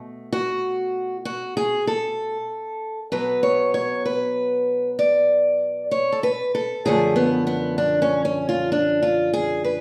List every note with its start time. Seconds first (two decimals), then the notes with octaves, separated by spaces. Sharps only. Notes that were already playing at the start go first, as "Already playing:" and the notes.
Already playing: B2 A3
0.33 F#4
1.25 F#4
1.57 G#4
1.87 A4
3.12 B2 F#3 B3 B4
3.43 C#5
3.74 C#5
4.05 B4
4.99 D5
5.91 C#5
6.12 A4
6.23 B4
6.55 A4
6.85 F#2 D3 F3 A3 G#4
7.16 B3
7.47 B3
7.78 D4
8.02 C#4
8.25 C#4
8.49 F4
8.72 D4
9.02 F4
9.33 G#4
9.64 B4